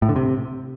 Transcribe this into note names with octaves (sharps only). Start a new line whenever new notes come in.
A2
D3
C3